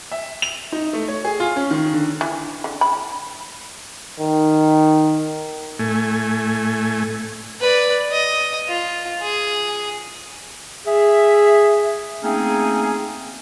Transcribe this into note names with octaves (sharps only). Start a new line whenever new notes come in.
E5
F7
D#4
A3
C#5
G#4
F4
C#4
D#3
D3
E3
D3
B5
D#3
A2 A3 G#5
B4 D5
D#5
F4
G#4
G#4 E5
A3 A#3 C4 C#4 D#4 G#4